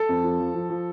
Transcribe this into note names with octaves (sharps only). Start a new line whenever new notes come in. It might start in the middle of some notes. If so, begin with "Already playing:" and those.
Already playing: A4 A5
F2
F3
F3
F3
F3